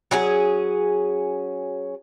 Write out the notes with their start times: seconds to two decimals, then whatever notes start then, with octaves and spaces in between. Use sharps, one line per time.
0.11 F#3 C#4 G#4